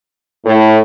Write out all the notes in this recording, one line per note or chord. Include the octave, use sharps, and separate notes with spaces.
A2